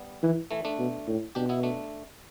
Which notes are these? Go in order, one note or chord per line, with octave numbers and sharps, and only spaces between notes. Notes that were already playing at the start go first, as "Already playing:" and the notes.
Already playing: G3 B3
E3
E3 A3
A3 D4
B2
A2
B2 D4 G4
B3 E4
A3 D4